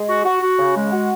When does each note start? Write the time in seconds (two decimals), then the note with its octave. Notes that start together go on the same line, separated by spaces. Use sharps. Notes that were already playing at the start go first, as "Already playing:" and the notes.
Already playing: G#3
0.08 F#4
0.25 F#4
0.41 F#4
0.58 C#3
0.76 G#3
0.92 F#4